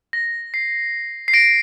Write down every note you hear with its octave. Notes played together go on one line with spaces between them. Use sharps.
A#6
C7
C7
A#6 D7